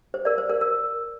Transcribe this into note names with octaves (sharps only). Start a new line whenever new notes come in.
C5
A#4 D5
C5
A#4
A#4